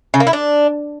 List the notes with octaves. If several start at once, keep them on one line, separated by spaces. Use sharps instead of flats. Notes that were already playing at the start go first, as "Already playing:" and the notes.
C#3
A#3
E4
D4